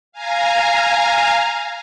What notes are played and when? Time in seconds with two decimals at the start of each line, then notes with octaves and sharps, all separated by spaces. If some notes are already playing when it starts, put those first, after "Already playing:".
0.12 F5 G#5 A#5